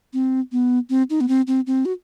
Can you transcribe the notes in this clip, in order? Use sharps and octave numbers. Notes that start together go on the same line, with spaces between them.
C4
B3
C4
D#4
B3
C4
C4
C4
F#4